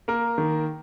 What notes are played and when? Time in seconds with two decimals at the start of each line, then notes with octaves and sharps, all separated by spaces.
0.08 A#3 A#4
0.38 D#3